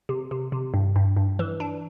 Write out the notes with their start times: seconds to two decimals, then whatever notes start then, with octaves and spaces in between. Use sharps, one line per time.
0.09 C3
0.31 C3
0.52 C3
0.74 G2
0.96 G2
1.17 G2
1.39 E3
1.60 D4